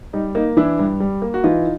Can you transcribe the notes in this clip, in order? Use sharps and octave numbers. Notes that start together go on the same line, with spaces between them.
G3 D#4
A#3 D#4
E3 D4 E4
G2
G3
A#3
F#4
E3 D#4 F4